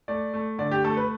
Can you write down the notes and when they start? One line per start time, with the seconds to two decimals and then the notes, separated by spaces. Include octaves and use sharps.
0.08 A3 D5
0.34 A3
0.59 D3 D5
0.71 G4
0.84 A3 A4
0.97 B4